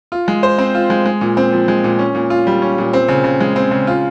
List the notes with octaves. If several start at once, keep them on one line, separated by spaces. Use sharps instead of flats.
F4
G#3
C5
C4
F4
G#3
G#3
A#2
C4
F3
G#3
A#2
C#4
A#2
F4
G3
C#4
A#2
C4
C#3
C#3
G#3
C4
C#3
F4